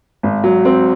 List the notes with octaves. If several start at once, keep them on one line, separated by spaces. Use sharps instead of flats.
G#1
F#3
C4